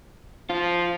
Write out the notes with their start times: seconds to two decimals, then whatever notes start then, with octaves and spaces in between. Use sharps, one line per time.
0.50 F3 F4